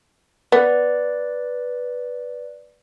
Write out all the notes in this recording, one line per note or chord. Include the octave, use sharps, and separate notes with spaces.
B3 B4 D5